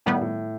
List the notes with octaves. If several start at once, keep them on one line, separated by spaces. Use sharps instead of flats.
A2 D#3 G3 B3
A2